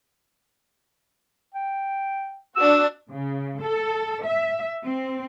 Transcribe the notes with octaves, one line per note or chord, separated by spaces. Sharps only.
G5
D4 F#4 E6
C#3
A4
E5
C4